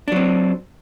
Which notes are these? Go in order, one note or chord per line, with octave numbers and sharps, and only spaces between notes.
F#3 C4 D4